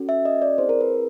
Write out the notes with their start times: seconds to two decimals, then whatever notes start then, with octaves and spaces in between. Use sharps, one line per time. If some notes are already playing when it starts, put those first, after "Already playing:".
Already playing: C#4 F#4 A4
0.09 E5
0.25 D#5
0.42 D5
0.58 C4 E4 G#4 C5
0.69 A#4
0.81 B4